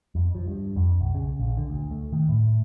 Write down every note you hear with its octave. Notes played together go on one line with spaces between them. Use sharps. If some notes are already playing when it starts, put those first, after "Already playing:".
F2
F3
G2
F2
B1
C#3
A#1
D3
D2
A3
D#3
A2